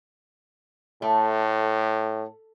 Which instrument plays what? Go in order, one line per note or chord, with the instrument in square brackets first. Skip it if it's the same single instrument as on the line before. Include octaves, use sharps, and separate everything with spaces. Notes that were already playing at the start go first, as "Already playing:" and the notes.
[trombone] A2 [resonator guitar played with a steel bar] A3